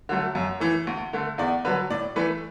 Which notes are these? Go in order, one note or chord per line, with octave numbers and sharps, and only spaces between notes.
D3 F#3 A3
F#2
E3 A3
D2
D3 A3
E2 D5
D3 F#3 B4
A2 D5
E3 A3 B4